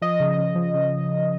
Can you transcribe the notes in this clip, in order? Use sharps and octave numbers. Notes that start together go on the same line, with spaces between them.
F3 D#5
C#3
C#3
F3
C#3